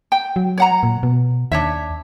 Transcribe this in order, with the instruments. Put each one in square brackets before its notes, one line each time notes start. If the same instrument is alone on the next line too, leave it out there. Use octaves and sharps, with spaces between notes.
[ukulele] G5
[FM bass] F#3
[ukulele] C#5 F#5 A#5
[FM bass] A#2
B2
[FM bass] D#2 [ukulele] D4 C#5 E5